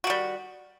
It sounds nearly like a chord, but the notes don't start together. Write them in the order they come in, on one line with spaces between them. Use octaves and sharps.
F#4 D#3 G3